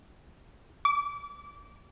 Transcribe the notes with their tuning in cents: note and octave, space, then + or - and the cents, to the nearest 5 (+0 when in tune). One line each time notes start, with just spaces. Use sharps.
D6 -20